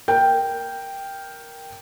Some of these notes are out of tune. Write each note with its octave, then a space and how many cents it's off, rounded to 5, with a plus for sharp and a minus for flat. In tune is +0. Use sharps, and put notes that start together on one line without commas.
A#4 +0 G5 +0